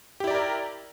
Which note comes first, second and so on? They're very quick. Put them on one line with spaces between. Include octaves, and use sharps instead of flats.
G4 E4 D5 A#5 A#4